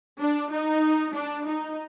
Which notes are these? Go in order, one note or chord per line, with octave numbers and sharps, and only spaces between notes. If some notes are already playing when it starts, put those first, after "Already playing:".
D4
D#4
D4
D#4